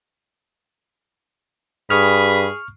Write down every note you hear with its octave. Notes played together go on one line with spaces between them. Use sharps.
G2 G#4 B5 C#6 F6